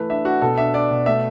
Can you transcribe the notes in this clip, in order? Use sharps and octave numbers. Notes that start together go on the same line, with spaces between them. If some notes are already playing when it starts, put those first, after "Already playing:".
Already playing: E3 A3 B4
D4 E5
D4 F#4
B2 A4
D4 E5
D4 D5
B2
A3 E5